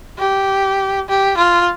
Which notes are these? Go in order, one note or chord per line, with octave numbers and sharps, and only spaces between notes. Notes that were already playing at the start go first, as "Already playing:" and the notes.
G4
G4
F4